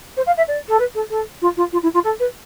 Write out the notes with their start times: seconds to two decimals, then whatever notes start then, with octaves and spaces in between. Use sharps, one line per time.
0.17 C5
0.26 F5
0.37 E5
0.48 D5
0.68 A4
0.79 B4
0.94 A4
1.10 A4
1.41 F4
1.57 F4
1.72 F4
1.83 E4
1.94 F4
2.04 A4
2.19 B4